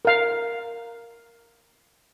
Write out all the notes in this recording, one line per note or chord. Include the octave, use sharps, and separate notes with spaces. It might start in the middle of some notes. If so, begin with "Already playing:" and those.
A#4 F5